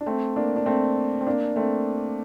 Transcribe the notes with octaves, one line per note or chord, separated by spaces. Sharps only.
D4
A3 C4
A#3 D4
D4
A3 C4
C4
A#3 D4
A3 C4